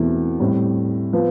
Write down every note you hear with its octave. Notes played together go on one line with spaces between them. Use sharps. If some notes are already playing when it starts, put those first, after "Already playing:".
Already playing: E2 B2 A3 C4 E4
A2 G3 C4
F3 B3